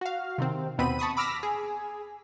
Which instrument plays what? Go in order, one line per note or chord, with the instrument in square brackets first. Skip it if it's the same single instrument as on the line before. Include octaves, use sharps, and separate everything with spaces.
[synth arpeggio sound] F#4 F5
C3 D#3 C4
D#2 B2 B3 C4 B5 D#7
A5 B5 C#6 D#6
B5 D6 E6 F6 A#6 B6
G#4